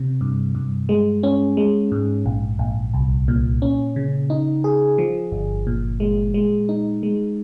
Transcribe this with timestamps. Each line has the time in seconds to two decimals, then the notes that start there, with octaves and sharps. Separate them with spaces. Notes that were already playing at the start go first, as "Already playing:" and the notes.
Already playing: C3
0.21 G2
0.55 G2
0.89 G#3
1.23 C#4
1.57 G#3
1.92 G#2
2.26 A#1
2.59 A#1
2.94 C2
3.28 A#2
3.62 C#4
3.96 C#3
4.30 D#4
4.64 G#4
4.98 F3
5.32 G1
5.67 A#2
6.00 G#3
6.34 G#3
6.69 D#4
7.03 G#3